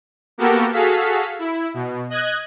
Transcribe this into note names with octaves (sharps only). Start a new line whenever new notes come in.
A#3 B3 F#4 G4 A4 A#4
F#4 G#4 A4 F5 B6
E4
B2
D#5 F#6 G#6